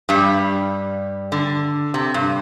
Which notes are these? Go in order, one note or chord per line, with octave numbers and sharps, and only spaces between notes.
G2 G3
D3
C3
G2